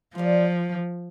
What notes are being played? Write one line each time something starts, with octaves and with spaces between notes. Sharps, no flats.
F3 G3 A#3 F4